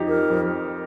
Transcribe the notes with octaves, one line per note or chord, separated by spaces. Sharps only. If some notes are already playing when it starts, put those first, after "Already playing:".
Already playing: F2 F3 D#4 G4
A#4
F2